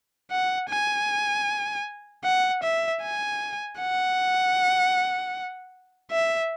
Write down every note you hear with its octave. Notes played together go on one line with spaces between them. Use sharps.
F#5
G#5
F#5
E5
G#5
F#5
E5